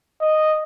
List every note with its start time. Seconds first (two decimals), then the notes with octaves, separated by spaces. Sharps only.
0.21 D#5